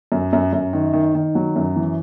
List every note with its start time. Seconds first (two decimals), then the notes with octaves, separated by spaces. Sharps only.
0.12 F#2
0.33 F#2
0.53 F#2
0.73 D#3
0.93 D#3
1.15 D#3
1.35 F#3
1.56 F#2
1.76 E3